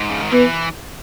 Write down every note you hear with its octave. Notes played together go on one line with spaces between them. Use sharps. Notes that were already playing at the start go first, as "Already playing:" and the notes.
Already playing: G#2
C#3
D#3
E3 B3